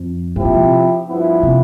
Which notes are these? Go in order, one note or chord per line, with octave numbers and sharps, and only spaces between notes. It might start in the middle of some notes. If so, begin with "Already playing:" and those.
Already playing: F2
G2 F3 C4 E4 G4
A2
B2
C3
G2 F3 B3 E4
C3